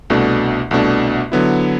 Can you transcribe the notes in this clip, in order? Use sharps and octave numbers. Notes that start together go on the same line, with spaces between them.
C2 B2 A3 D4
C2 B2 A3 D4
D3 F#3 B3 E4